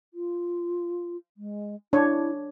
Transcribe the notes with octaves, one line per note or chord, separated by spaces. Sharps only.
F4
G#3
D4 E4 C#5